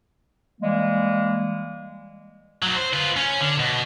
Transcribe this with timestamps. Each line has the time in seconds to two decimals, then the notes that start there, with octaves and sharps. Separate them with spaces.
0.61 E3 G3 G#3 A#3
2.63 F#3 D#4
2.76 C5
2.93 F4 B4
3.17 C#4
3.41 D3
3.60 B2